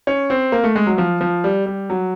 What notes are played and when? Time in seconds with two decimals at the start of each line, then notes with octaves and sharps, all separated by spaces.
0.07 C#4
0.30 C4
0.52 A#3
0.64 A3
0.76 G#3
0.87 F#3
0.98 F3
1.21 F3
1.44 G3
1.66 G3
1.90 F#3